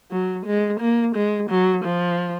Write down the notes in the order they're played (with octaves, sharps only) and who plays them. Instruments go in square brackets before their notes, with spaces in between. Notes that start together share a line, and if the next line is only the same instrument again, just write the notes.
[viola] F#3
G#3
A#3
G#3
F#3
F3